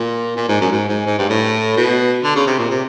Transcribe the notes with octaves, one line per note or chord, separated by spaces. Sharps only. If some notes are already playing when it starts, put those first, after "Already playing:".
Already playing: A#2
A#2
G#2
F#2
G#2
G#2
G#2
G2
A2
B2
D3
C#3
C3
A#2
C3